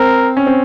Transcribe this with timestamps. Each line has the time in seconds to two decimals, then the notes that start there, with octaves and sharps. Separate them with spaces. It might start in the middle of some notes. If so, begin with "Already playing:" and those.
Already playing: C4 A#4
0.37 C#4
0.47 C4